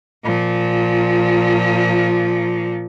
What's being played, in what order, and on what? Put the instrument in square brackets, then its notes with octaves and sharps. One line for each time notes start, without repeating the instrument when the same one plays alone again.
[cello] A#2 F3